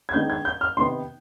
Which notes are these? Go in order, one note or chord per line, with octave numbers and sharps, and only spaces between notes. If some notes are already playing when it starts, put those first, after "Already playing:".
G#6
D#3 G#3 B3 D4 G6
G#6
G6
F6
C3 D#3 B3 D#4 C6